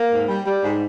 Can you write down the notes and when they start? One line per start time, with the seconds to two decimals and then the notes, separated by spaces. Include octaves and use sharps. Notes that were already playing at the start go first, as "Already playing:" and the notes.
Already playing: A#3
0.11 G#2
0.28 G3
0.46 G3
0.62 G#2